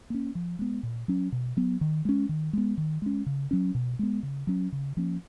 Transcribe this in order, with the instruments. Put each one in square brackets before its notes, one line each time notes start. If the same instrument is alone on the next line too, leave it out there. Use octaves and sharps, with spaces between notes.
[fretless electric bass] A#3 C#4
F3
G#3 B3
A#2
F#3 C#4
B2
F#3 B3
D#3
G#3 C#4
D#3
G#3 B3
D#3
G#3 C#4
C#3
F#3 C#4
B2
G#3 B3
C#3
F#3 C#4
C#3
F3 A#3 C#4